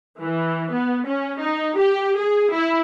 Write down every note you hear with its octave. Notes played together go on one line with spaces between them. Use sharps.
E3
B3
C#4
D#4
G4
G#4
E4